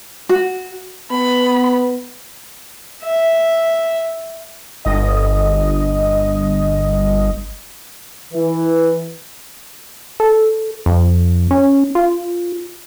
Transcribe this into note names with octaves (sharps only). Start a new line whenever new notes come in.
F#4
B3 B5
E5
G1 D#5
E3
A4
F2
C#4
F4